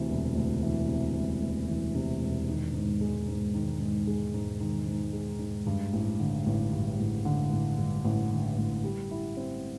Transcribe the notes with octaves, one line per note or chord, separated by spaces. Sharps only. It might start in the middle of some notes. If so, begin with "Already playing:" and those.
Already playing: D2 C3 E3
E1
D2
E3
C3
E1
D2
E3
C3
E1
D#3
G#2
G#3
G#2
D#3
G#2
G#3
G#2
D#3
G#2
G#3
G#2
G2
A1
D3
A1
G2
A1
D3
A1
G2
A1
D3
A1
G3
E4
C4